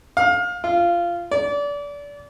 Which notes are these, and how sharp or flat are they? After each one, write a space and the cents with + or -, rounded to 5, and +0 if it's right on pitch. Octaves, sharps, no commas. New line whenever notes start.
F5 +25
F4 -15
D5 -30